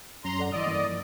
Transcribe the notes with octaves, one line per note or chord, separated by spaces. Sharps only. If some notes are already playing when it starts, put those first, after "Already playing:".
F#2 F#3 C#4 A#5 C6
A4 D5 F#5
A1 G2 E3 D5 D#5 E6
G2 E3 A#3
F3